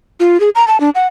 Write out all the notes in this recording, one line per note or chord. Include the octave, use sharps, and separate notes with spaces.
F4
G#4
A#5
A5
D4
F#5